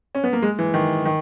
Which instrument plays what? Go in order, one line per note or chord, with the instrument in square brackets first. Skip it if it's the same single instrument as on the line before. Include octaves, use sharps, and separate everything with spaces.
[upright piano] C#4
B3
A#3
G#3
E3
D#3
D#3